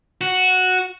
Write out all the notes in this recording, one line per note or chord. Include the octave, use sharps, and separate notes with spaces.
F#4